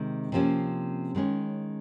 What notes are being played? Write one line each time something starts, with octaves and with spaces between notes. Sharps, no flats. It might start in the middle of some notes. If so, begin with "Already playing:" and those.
Already playing: C3 D#3 G#3 C4
C3 F3 A#3 C#4
D#3 G#3 C#4